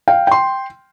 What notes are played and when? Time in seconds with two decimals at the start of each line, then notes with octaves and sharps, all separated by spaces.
0.08 F5 G5
0.27 G5 C6